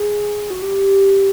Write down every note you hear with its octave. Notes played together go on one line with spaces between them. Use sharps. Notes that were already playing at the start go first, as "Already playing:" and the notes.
Already playing: G#4
F#4
G4